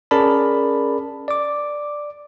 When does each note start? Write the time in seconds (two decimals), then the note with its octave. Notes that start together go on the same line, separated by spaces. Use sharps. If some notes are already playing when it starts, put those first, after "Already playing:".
0.11 C#4 G#4 A#4 D5 A5 B5
1.28 D5 D6